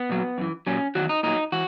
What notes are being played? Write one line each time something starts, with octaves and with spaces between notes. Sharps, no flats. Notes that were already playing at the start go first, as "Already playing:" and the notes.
Already playing: B3
A#2 F#3
F#2 E3
A#2 F#3 C#4
E2 D#3 F#3 F#4
D#4
A#2 F#3 D#4
E3 F#4